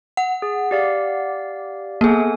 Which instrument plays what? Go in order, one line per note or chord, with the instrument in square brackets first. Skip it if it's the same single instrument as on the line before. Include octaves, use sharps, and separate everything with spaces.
[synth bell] F#5
[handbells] G#4
G4 D5 F5
[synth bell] A#3 G#4 [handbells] B3 A4 G#5